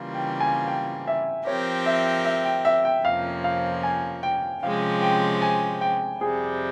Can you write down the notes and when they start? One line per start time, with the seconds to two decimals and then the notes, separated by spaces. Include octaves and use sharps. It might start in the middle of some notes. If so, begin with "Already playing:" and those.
Already playing: C#3 E3 G3 A#3 F4
0.15 G5
0.40 G#5
0.68 G5
1.08 E5
1.46 F3 C4 G4 A#4 C#5
1.86 E5
2.25 E5
2.45 G5
2.65 E5
2.85 G5
3.04 F2 C3 F3 A#3 C#4 F5
3.44 F5
3.83 G#5
4.23 G5
4.62 C3 F3 G#3 C#4 G4 F5
5.02 G5
5.42 G#5
5.81 G5
6.20 F2 C3 G3 G#4